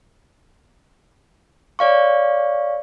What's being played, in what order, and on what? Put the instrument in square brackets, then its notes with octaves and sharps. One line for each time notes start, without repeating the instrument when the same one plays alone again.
[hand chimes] C#5 D5 F5 C#6